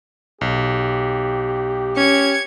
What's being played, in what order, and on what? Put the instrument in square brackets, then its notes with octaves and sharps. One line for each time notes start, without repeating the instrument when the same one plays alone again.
[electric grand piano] B1 [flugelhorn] G4
[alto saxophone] C#4 [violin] G#6 C#7